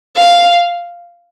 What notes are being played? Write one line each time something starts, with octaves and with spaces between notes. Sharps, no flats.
F5